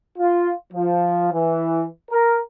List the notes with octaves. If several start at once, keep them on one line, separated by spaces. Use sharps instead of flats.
F4
F3
E3
A#4